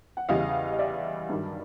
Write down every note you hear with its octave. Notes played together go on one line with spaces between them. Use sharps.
F#5
E2 C#3 E3 G3 D#5 F5
D#5
D5 E5
G2 D#3 F#3